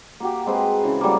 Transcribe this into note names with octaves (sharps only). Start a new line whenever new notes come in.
A#3 F#4 G4
G#3 C4 B4
C#3 E3
F#3 G3 A3 A#3